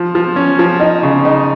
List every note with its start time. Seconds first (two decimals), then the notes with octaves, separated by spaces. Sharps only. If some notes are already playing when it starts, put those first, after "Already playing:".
Already playing: F3
0.15 F3
0.36 C#4
0.59 F3
0.80 D#4
1.03 C#3
1.25 D#4